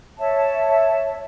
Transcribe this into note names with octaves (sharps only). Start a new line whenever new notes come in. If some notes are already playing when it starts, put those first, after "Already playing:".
C#5 E5 A5